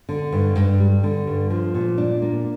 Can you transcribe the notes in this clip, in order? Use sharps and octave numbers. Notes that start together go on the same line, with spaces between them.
D3
G2
G2
G3
D3
G2
F3
A#2
D4
A#3